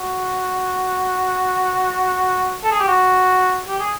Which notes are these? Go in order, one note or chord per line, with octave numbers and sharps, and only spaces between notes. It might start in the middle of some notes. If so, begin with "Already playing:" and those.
Already playing: F#4
A4
G#4
G4
F#4
G4
G#4